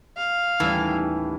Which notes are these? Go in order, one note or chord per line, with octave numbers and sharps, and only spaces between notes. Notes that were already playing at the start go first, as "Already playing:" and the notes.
F5
D#2 A2 E3 G3 C#4